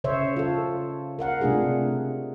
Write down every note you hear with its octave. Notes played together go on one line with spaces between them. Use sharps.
C#3 C5 C#5 E5
F4 A4
A#4 F5 F#5
C3 A3 D4 F4 G#4